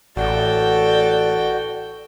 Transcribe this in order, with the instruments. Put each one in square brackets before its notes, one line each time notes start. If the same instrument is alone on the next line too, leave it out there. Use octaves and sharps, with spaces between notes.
[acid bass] A1 [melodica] F#4 [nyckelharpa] A4 G5 [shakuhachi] D5